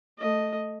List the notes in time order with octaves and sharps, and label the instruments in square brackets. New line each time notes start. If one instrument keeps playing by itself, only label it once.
[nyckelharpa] A3 D#5